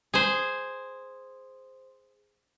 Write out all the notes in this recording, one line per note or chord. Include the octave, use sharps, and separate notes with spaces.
G#4 C5